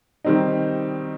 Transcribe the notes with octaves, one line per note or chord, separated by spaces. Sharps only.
D#3 G3 C4 D#4